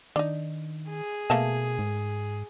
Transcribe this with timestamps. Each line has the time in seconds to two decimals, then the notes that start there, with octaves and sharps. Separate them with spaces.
0.16 D#3 D4 D#4
0.89 G#4
1.30 B2 A3 A#3 A5
1.79 G#2